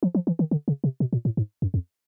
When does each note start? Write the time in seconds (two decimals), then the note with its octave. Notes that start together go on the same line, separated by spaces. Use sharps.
0.03 F3
0.15 F3
0.27 E3
0.39 D#3
0.51 D3
0.68 C#3
0.84 C3
1.00 B2
1.13 A#2
1.25 A2
1.37 G#2
1.62 F#2
1.74 F2